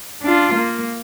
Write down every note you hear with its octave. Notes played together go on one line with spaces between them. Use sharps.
D4 F4
A#3